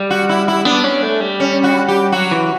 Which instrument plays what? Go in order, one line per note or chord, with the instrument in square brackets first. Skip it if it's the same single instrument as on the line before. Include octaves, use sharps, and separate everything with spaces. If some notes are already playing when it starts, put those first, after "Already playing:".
Already playing: [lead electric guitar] G3
[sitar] F#4
E4
E4
[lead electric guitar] B3 [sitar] D4
[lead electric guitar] C#4
A3
G3
[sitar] C#4
F#4
G4
[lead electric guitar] F#3 [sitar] F#4
[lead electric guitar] E3